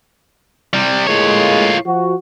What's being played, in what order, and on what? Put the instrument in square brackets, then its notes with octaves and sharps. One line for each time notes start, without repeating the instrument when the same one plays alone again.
[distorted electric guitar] C3 G3
[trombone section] A2 G#3 A#3 [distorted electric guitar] F4 C#5
[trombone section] F3 F#4